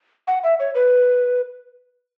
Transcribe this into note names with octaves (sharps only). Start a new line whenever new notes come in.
F#5
E5
C#5
B4